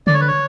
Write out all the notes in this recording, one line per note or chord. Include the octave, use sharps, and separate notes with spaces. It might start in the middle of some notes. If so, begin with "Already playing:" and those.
D3 D5
C#5
B4
C#5